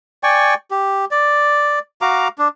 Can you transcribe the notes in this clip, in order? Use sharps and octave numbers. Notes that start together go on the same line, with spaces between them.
D5 G5 G#5 C#6
G4
D5
F#4 F5 A#5 D6
D4